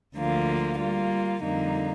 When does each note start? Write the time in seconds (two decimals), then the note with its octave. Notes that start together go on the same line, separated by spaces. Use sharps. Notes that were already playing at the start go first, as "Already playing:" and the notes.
0.16 D2 D3 F3 A#3 F4
0.79 G3 A#3 F4
1.41 F2 D3 G3 A#3 D#4